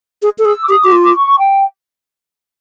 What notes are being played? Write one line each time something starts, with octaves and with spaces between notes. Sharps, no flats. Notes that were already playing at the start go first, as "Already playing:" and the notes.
G#4
A4
G#4 E6
D6
G4 D#6
F#4 D6
F4
D6
C#6
G5